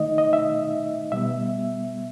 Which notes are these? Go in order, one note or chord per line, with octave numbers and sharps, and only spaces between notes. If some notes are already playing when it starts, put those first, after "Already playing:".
Already playing: D#3 A3 D#4 D#5
D#5
E5
B2 G3 B3 E5